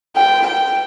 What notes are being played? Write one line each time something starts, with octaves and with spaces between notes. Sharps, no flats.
G5
G5